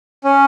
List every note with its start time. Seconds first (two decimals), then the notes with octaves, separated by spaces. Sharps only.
0.24 C#4